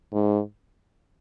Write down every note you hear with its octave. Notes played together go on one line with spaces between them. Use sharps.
G#2